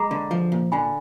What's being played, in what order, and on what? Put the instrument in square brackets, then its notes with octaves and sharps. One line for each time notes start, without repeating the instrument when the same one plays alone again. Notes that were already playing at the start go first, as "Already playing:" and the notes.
Already playing: [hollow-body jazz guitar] G#3 [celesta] A#5 B5 D6
[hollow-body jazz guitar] D3
F3
A#2
[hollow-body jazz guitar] D3 [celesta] G#5 B5